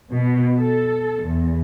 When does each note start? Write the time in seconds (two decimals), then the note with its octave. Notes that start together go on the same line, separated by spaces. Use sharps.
0.12 B2
0.58 A4
1.23 E2